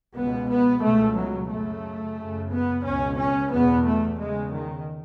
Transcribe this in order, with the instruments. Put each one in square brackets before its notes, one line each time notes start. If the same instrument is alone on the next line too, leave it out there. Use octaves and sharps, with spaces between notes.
[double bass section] C#2 B2 B3
B3
C#2 B2 A3
F#3
F#2 C#3 A3
F#2 C#3
B3
C#2 B2 C#4
C#4
E2 B2 B3
A3
E2 C#3 G#3
D#3